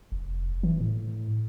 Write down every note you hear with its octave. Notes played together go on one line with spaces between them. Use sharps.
F1
E3
A2